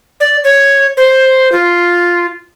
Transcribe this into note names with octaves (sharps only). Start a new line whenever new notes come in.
D5
C#5
C5
F4